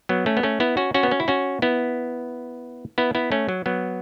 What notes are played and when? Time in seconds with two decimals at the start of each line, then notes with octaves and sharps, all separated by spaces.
0.09 F#3 B3
0.26 A3 C#4
0.37 B3
0.43 A3 C#4
0.60 B3 E4
0.77 C#4 F#4
0.94 C#4 F#4
1.03 B3
1.11 C#4
1.20 E4
1.28 C#4 F#4
1.62 B3 E4
2.98 B3 E4
3.15 B3 E4
3.32 A3 C#4
3.49 F#3
3.66 F#3 B3